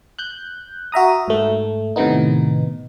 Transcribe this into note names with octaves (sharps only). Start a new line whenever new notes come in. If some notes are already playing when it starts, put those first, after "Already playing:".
F#6 G6
F#4 E5 A#5 D#6
G#2 A3
A2 C3 D#3 B3 D#4